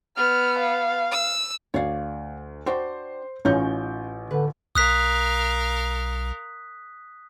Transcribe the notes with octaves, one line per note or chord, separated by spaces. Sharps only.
B3 F6
F5
E6
D2 C#5 D5 F5
D4 F#4 C5 G5
A1 C#4 D#4 F4 C#5 G6
D3 B4
B1 A#4 F5 D#6 F#6 B6